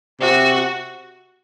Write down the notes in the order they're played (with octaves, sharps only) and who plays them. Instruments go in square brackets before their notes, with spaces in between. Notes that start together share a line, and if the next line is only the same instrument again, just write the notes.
[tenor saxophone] C3 [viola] F#4